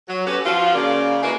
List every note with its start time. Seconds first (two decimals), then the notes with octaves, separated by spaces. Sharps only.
0.08 F#3
0.26 B3 C#4 F#4 G4 A4 B4
0.45 F3 F4 F#4
0.74 C#3 A#3 D5
1.23 G#3 A#3 E4 F#4 A#4 B4